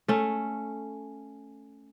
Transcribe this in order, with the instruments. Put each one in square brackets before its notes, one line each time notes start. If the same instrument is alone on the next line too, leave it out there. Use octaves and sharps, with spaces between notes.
[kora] A3 C#4